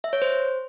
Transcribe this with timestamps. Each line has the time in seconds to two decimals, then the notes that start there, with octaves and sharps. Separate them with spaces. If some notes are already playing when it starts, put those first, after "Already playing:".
0.04 E5
0.13 C#5
0.22 C5